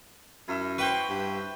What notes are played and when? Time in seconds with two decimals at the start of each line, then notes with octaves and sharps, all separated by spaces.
0.48 F#2 E4 E5
0.78 F#4 B4 C5 G5
1.09 G2